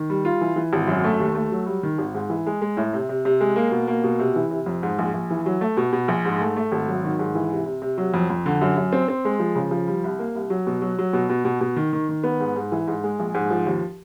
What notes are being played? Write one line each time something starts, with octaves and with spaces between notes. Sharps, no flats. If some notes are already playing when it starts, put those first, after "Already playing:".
Already playing: D#3
G3
F4
E3
E3
G#1
F#2
A3
D#2
A3
F#3
G3
D#3
G#1
G#2
E3
G#3
G#3
A2
C3
C3
C3
G#3
A#3
B2
A#3
B2
C3
E3
C3
F2
G#2
A#1
A#1
E3
F#3
A3
B2
B2
A#1
G#2
A3
A3
G#1
F#3
D#3
G#2
E3
C3
C3
C3
F#3
F2
F2
D3
F#2
F#2
C4
C4
G#3
F3
C#3
F3
G3
C2
A#3
C2
F#3
B2
F#3
F#3
B2
B2
B2
B2
D#3
D#3
D#3
B3
G#2
G#2
E3
G#2
G#3
A#1
G#2
F3
D#2